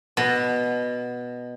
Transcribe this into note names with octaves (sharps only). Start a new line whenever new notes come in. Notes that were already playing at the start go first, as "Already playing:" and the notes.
B2